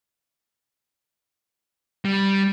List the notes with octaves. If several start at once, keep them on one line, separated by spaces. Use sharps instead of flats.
G3